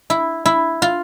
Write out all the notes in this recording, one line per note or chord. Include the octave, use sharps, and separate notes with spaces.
E4
E4
F4